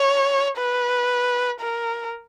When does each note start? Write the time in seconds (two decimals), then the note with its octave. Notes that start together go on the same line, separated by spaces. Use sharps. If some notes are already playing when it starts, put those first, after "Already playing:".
Already playing: C#5
0.58 B4
1.60 A#4